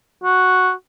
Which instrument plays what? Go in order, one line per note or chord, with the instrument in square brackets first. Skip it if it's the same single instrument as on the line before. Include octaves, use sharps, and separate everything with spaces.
[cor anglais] F#4